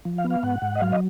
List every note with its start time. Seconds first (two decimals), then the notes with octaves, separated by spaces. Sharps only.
0.05 F3
0.18 F5
0.24 B3
0.30 F5
0.43 G#2 F#5
0.62 G#2
0.75 D#5
0.81 F#3 F5
0.92 D#5